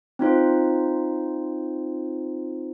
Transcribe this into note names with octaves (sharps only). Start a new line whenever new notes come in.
C4 D#4 F4 C5